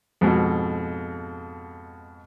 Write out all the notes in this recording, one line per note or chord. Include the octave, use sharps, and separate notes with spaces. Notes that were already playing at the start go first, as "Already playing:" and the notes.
F2 G#2 B2